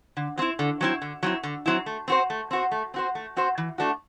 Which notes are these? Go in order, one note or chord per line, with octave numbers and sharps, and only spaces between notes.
D3
F#3 C4 E4
D3
F#3 C4 E4
D3
F#3 C4 E4
D3
F#3 C4 E4
A3
C4 F#4 C5
A3
C4 F#4 C5
A3
C4 F#4 C5
A3
C4 F#4 C5
E3
A3 D4 F#4